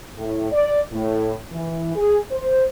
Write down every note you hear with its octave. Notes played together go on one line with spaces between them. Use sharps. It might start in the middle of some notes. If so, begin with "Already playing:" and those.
A2
D5
A2
E3
G#4
C5